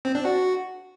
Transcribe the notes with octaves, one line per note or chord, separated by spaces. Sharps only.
C4
D4
F#4